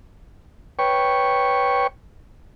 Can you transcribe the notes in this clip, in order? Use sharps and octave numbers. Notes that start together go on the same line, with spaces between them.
B4 C#5 G5 C#6